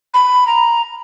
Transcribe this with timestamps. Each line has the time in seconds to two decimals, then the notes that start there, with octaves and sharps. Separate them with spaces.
0.14 B5
0.47 A#5